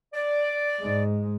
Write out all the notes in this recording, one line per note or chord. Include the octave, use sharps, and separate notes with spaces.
D5
G#2 G#3